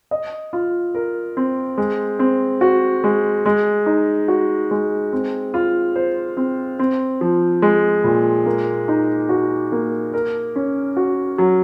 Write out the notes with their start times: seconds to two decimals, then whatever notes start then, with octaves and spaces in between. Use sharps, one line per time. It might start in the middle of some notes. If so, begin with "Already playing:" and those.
0.11 D#5
0.53 F4
0.95 A#4
1.37 C4
1.78 G#3
2.19 C4
2.61 F#4
3.04 G#3
3.46 G#3
3.86 D#4
4.28 F#4
4.71 G#3
5.13 C4
5.54 F4
5.96 C5
6.37 C4
6.79 C4
7.21 F3
7.62 G#3
8.04 A#2
8.46 A#3
8.88 D#4
9.29 F#4
9.72 A#3
10.14 A#4
10.56 C#4
10.97 F#4
11.38 F#3